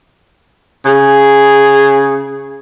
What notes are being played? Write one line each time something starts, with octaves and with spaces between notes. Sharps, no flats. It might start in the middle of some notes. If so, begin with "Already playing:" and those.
C#3 G#4